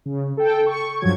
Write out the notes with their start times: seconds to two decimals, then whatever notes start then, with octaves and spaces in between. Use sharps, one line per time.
0.05 C#3
0.37 A4 G5
0.66 C#6
1.00 G2 F3 F#3 G#6